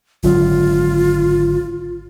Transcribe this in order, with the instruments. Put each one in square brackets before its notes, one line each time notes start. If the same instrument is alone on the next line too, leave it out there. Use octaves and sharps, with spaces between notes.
[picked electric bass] G#1 D3 F#3 [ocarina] F4